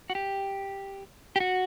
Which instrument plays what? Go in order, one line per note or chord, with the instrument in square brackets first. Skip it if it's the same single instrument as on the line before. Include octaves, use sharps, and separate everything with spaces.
[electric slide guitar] F#4
G4
G4
F#4